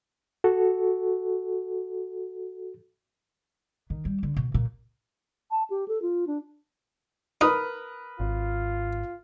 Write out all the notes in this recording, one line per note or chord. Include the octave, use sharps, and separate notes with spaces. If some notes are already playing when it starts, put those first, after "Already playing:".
F#4 A4
D#3
G3
D3
B2
A#2
A5
G4
A4
F4
D4
D#4 A#4 B4 D#6
G#1 F4